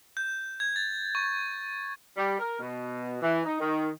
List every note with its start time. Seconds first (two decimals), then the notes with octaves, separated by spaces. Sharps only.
0.17 G6
0.60 G#6
0.76 A6
1.15 C#6
2.17 G3
2.39 A#4
2.59 B2
3.22 E3
3.45 D#4
3.60 D#3